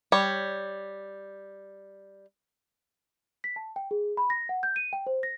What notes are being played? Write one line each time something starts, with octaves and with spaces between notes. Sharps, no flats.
G3 C#5
B6
A5
G5
G#4
B5
A#6
F#5
G6
D#7
G5
C5
A#6